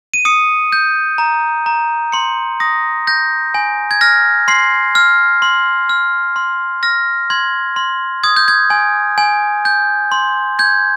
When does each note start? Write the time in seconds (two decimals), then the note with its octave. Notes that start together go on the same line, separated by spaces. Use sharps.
0.14 D#7
0.25 D#6 C#7
0.72 G6
1.18 A#5
1.66 A#5
2.12 C6 C#7
2.60 D#6 A#6
3.07 G6 A#6
3.54 G#5
3.91 G#6
4.01 F6 A#6
4.48 C6 C7
4.95 F6
5.42 C6
5.89 F6
6.36 C6
6.83 F6 A#6
7.30 C6 G#6
7.76 C6
8.24 D#6 G#6
8.36 G6
8.48 G#6
8.70 G#5
9.18 G#5
9.65 G6
10.12 C6
10.59 G6 G#6